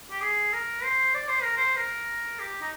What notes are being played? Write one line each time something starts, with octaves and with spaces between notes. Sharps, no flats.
G4
G#4
A#4
C5
D5
C5
A#4
C5
A#4
G4
D#4